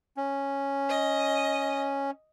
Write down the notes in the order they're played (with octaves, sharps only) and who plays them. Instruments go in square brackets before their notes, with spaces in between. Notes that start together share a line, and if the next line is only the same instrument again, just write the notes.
[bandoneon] C#4
[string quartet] D#5